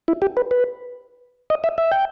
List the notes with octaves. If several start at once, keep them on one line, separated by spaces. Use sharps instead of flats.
E4
G4
B4
B4
D#5
E5
E5
G5